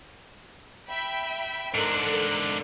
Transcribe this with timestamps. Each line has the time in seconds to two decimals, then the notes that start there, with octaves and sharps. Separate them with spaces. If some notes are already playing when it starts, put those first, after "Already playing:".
0.89 E5 G5 B5
1.74 G#2 D3 A4 A#4 F#6